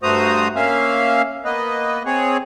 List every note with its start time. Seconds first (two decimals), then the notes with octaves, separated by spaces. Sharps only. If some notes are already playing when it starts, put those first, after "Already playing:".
0.03 G2 A3 F#4 C5 A#5 D#6
0.56 A#3 C#4 E5 F5
1.45 A#3 B3 B4 D#5
2.06 C4 G#4 C#5